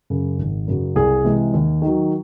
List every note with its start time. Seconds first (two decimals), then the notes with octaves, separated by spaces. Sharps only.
0.10 F#2 C#3
0.38 G#1
0.68 F#2 C#3 F#3
0.96 C2 G#4
1.24 C3 E3 G#3
1.54 D#2
1.82 D#3 F#3